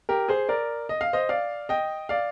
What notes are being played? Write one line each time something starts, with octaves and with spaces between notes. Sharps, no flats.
G4 A#4
G#4 C5
A#4 D5
D#5
F5
C5 D#5
D5 F5
D#5 G5
D5 F5